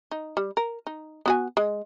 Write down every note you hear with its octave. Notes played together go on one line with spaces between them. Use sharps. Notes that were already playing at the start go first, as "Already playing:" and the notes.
D#4
G3
A#4
D#4
B3 F#4 G#5
G#3